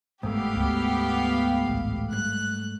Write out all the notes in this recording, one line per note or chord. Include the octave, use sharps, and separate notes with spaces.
G1 G#2 A3 B3 G4 F5
D2
A1 D2
G3 F#6